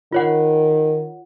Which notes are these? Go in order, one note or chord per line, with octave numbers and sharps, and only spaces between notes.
D#3 F4 C#5 F#5